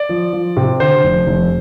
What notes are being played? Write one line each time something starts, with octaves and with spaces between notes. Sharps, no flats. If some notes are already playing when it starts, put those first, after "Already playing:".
Already playing: D5
F3
F3
C3
D3 C5
F1
F1